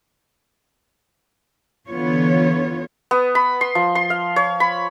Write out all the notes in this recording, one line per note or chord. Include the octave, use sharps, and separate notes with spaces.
D3 E3 B3 F4 C#5
B3
B5
C6
F3
C6
F5
C#5
B5